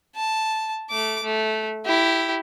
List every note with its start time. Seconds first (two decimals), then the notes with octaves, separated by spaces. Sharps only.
0.15 A5
0.90 A3 D6
1.23 A3
1.85 E4 G4